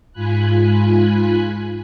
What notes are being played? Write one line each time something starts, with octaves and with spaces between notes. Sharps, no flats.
G#2 F4 G#5 B5 F#6